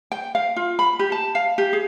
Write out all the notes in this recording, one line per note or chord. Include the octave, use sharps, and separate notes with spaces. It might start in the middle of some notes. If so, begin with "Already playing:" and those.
G5
F5
F4
B5
G4
A5
F5
G4
G#4